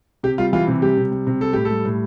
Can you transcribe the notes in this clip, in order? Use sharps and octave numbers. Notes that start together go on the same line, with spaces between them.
C3 G4
G3 F4
E3 F4
C3
G3 G4
C3
G3
C3
G3 A4
A2 G4
A4
G3
A2